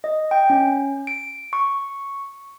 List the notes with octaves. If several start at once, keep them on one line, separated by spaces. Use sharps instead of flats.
D#5
G5
C#4
D7
C#6